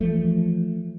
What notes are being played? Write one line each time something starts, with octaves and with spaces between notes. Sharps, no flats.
E3 F3 A3